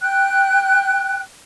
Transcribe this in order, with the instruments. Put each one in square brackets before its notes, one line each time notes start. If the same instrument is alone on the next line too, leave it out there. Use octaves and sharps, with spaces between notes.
[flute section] G5 F#6